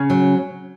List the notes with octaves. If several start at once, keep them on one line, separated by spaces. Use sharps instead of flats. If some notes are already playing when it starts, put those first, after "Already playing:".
Already playing: C#3 C#4
F#3